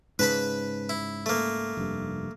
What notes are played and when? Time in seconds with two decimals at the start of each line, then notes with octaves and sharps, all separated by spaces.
0.19 G#2 C#3 B4 A5 B5
0.89 E4
1.26 A3 A#3
1.77 F1 G2